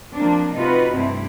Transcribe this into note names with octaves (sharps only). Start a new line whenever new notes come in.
F3 A#3 C4 D4
C3 D#4 F4 F#4 B4
G2 C3 A3 C4 E4